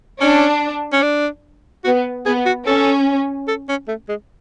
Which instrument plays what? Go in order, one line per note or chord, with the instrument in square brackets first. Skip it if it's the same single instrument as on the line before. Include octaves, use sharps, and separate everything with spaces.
[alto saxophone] C#4 [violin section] D4
[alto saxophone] C#4
D4
[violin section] B3 [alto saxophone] F#4
[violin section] B3 [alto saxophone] G#4
[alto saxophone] F#4
[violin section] C#4 [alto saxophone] A4
[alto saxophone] A4
C#4
A3
G#3